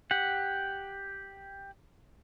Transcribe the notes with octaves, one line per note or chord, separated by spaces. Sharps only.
G4 F#5